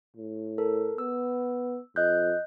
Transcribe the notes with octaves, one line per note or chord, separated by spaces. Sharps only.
A2
A4 A#4
B3 E6
F2 D#5 F#6 G6